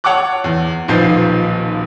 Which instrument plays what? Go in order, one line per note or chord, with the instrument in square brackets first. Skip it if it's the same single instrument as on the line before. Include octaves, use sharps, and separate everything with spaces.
[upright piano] C#5 F#5 A5 C#6 D6 F#6
E2
D#1 B1 F3 B4 G6 C7